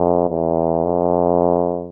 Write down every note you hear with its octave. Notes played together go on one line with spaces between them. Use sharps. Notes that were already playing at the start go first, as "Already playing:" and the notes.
Already playing: F2
E2
F2